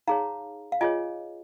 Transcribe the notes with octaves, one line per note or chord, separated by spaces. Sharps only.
D#4 G#4 C#5 F5 A#5
F5
F4 G#4 C#5 D#5 G#5